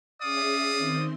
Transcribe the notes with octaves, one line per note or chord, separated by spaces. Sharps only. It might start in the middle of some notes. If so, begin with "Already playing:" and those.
C#4 G#4 D5 E5 F5 D#6
D#3 C4 C6